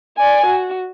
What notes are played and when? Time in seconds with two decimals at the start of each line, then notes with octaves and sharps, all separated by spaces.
0.17 D5 G#5
0.46 F#4